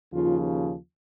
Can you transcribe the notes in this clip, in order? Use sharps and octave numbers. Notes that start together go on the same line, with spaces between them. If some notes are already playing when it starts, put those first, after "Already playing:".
D#2 C#3 F3 F4